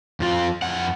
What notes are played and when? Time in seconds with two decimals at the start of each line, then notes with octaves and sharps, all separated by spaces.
0.20 F2 F3 F4
0.62 F2 F#5